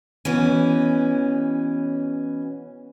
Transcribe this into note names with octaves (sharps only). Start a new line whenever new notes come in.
B2 E3 C#4